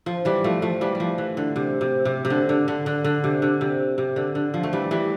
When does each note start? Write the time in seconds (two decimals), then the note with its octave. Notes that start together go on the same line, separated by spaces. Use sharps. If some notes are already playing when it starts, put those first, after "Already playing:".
0.06 F3
0.25 E3 G3
0.44 F3 A3
0.62 F3 A3
0.81 E3 G3
0.95 G3
1.00 F3
1.18 E3
1.37 D3
1.56 C3
1.81 C3
2.05 C3
2.25 C3
2.30 D3
2.49 D3
2.68 D3
2.86 D3
3.04 D3
3.24 C3
3.42 D3
3.61 C3
3.98 C3
4.16 D3
4.35 D3
4.54 F3
4.63 A3
4.73 E3 G3
4.91 E3 G3